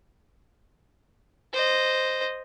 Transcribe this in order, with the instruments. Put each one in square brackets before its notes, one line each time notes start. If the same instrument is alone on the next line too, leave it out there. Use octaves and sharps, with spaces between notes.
[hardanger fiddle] C5 D#5